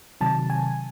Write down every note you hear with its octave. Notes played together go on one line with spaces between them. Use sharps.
C3 D#3 F#3 A5
G#5